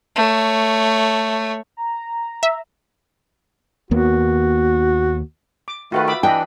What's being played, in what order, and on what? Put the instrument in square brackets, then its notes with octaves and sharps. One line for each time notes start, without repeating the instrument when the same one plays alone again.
[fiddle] A3 C#5
[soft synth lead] A#5
[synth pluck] E5
[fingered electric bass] D#2 A#3 B3 [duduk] F#4
[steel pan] D6
[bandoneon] D#3 A3 [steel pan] F4 F#4 B4
[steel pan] E5 B5 D6
[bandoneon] E3 D4 [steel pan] E4 D#5 B5 [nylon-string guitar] G5